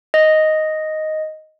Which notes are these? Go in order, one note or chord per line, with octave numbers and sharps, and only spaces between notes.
D#5